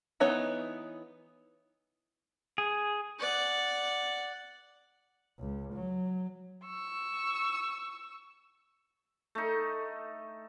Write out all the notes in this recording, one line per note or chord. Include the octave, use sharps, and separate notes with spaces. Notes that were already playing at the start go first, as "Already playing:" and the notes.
E3 B3 D#4 C#5
G#4
D5 F#5
C#2
F#3
C#6 E6
A3 D#4